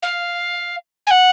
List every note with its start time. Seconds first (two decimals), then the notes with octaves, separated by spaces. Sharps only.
0.02 F5
1.07 G#5
1.11 F#5